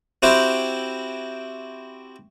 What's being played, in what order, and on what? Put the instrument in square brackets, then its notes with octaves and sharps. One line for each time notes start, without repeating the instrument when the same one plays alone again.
[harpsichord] C4 E4 F#4 G4 C5